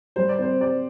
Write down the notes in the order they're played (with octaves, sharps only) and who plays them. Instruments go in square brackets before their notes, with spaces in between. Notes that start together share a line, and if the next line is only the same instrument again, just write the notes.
[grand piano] G3 [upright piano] C5
[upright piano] D5
[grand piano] C4 [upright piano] C5
[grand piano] G4 [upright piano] D5